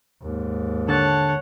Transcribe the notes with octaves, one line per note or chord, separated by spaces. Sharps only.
D#2 G#2
D3 C#5 F#5 A5